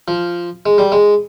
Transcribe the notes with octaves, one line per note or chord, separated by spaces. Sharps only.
F3
G#3
G3
G#3